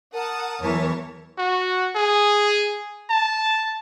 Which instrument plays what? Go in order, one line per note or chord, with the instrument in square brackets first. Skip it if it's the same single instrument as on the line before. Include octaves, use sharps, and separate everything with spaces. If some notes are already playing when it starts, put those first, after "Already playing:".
[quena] A#4 [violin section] F#5 A5 D#6
[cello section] E2 E3 F#3 [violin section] C#5 A5
[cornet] F#4
G#4
A5